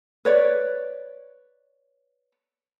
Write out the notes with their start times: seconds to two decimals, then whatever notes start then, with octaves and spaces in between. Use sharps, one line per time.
0.25 B4 C#5 D5